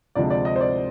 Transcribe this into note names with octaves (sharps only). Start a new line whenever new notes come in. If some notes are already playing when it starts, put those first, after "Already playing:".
D2 C3 F3 G#3 D4 D5
D5
D#5
C5
D5